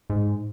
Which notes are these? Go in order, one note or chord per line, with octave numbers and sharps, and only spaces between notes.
G#2